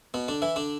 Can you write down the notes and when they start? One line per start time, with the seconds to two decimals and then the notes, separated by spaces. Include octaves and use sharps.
0.14 B2 B3
0.28 D3 D4
0.42 E3 E4
0.56 D3 D4